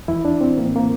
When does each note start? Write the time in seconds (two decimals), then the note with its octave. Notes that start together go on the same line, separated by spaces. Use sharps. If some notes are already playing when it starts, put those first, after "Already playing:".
0.08 E2 E3 E4
0.25 D4
0.41 C4
0.57 A2 E3 A#3
0.66 C4
0.76 A#3